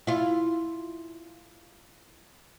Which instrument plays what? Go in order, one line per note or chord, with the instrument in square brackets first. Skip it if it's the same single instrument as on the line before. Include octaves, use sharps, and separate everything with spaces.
[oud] E4 F4